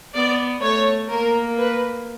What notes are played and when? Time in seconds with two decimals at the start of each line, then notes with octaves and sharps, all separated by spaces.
0.14 B3 D5
0.62 A3 C#5
1.10 A#3 A#4
1.58 B4